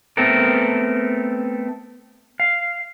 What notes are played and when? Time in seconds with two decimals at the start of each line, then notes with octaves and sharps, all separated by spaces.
0.17 A3 B3 C4 A4 A#4
2.40 F5